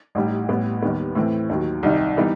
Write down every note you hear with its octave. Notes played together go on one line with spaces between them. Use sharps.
A1 A2 G3 D#4
A1 A2 G3 B3
D#2 D#3 G3 B3
A2 E3 A3 C4
D#2 D#3 F#3
C2 C3 D#3 G3 D#4
E3 G3 B3 D#4